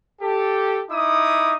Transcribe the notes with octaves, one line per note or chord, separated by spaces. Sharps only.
G4 A4
D#4 E4 D6 D#6